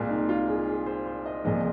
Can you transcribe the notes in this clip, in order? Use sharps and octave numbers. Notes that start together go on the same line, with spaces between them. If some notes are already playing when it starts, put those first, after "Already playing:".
Already playing: C2 A#2 G#3 F4
D#4
F4
G#4
G#4
C5
C5
D#5
C2 A#2 F3 G#3 D#5